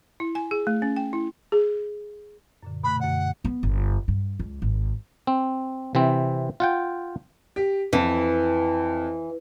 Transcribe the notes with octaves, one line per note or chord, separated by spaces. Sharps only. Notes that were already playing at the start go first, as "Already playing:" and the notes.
E4
G#5
G#4
A3
C#4
G5
E4
G#4
F#2 A#2 D3
B2 A3 B5 F#6
F#2 D3 F#5
B3
G1
G2
C#2
G#1
C4
C3 E3 C4
F4 F#5 G5
G4
F2 E3